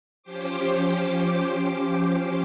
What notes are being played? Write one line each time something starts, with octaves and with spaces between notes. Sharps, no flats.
F3 C#4 G4 C5 D6